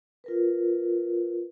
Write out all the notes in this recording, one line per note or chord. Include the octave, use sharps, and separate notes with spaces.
F4 A#4 B4